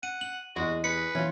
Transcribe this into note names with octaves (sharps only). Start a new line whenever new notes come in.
F#5 D#7
F#7
E2 G#3 F#4 D#5
G#4 B4 C#7
E3 C#4 F4